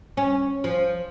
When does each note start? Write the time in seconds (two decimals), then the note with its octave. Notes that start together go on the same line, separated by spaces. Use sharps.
0.17 C#4
0.64 F3